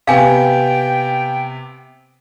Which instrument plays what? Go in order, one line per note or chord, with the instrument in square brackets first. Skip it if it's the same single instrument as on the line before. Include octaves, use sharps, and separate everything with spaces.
[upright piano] C3 B3 [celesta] F5 G#5 [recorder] G5